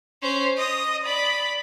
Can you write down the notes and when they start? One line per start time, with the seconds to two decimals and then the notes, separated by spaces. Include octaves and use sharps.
0.22 C#4 C5
0.57 D#5 D#6
1.05 D5 B5